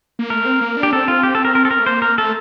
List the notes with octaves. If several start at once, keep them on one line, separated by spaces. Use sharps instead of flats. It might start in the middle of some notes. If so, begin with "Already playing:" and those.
A#3
A3 A#4
C4
A#3
D4
G4
C4 A4
F4
G4
A4
A#4
A#4
A4
A#4
A3
A#3 C5
A#4
A3 A4